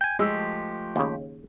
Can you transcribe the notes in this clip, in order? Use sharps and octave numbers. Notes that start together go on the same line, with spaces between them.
G5 G#5
F3 G#3 A3 G4 E6
D#2 C#3